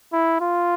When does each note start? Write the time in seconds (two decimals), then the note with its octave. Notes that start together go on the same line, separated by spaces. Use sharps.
0.13 E4
0.41 F4